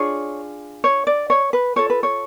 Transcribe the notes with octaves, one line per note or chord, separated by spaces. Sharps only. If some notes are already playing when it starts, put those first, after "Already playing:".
Already playing: D4 F4 G#4 C#5
C#5
D5
C#5
B4
F4 A4 C#5
B4
C#5